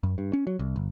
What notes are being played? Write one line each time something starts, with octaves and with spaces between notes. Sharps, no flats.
F#2
G2
C#4
F#3
C2
G1